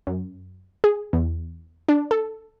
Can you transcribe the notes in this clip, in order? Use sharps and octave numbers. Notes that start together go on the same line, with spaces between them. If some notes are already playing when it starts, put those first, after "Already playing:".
F#2
G#4
E2
D4
A4